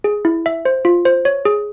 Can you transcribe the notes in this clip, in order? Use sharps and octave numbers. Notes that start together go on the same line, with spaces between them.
G#4
E4
E5
C5
F4
C5
C#5
G#4